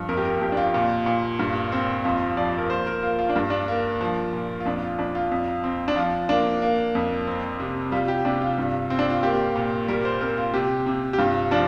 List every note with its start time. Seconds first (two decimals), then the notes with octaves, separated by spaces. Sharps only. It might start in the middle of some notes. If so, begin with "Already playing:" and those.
Already playing: G2 F3
0.09 F2 A#4
0.17 G4
0.25 A#4
0.41 F2 G4
0.52 D4
0.57 F4
0.74 A#2
1.06 A#2
1.39 G2
1.72 C4
2.04 F2 F4
2.37 F3 D5
2.58 A#4
2.70 A#3 C5
2.87 A#4
3.02 A#3 F4
3.19 F4
3.29 D4
3.36 G2
3.50 D4
3.68 A#3
4.01 F3
4.33 A#2
4.60 F4
4.65 F2 D4
4.82 F4
4.98 F2 D4
5.15 F4
5.31 F2
5.64 C4
5.88 D4
5.96 F3 F4
6.29 A#3 D4
6.62 A#3
6.95 F2
7.27 C4
7.60 C3
7.92 G3 F4
8.08 G4
8.25 C3 D4
8.42 F4
8.58 G2
8.90 C4
8.99 D4
9.10 F4
9.23 A#3 G4
9.56 A#2
9.88 G3 A#4
10.05 C5
10.21 C4 A#4
10.38 F4
10.54 C3 G4
10.86 C3
11.13 G4
11.18 G2 F4
11.51 F3 D4